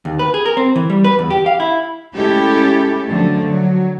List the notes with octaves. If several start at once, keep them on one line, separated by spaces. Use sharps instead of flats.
D#2
B4
G#4
A#4
C4
E3
G3
B4
E2
G4
F5
E4
G#3 A3 C#4 E4 G4 A4
D3 F3 F#3 A3
F#3